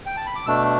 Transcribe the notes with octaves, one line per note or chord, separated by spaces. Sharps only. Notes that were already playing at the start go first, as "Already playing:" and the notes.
G5
A5
B5
D6
B2 A3 D4 E6